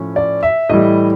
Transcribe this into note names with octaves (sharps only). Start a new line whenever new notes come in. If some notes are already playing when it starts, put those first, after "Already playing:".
Already playing: A2 F3 C#4
D5
E5
A2 E3 G3 D#5